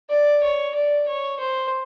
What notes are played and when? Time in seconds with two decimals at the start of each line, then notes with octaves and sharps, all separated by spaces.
0.10 D5
0.43 C#5
0.75 D5
1.08 C#5
1.40 C5